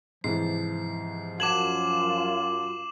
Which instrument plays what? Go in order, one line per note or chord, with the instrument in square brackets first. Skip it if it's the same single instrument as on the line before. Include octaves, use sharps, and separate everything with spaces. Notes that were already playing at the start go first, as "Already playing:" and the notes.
[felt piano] G#2 C3 E3 [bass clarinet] F3 [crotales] C7
[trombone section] F#2 F4 [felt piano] F#5 A5 G#6 [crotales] D6 E7 F#7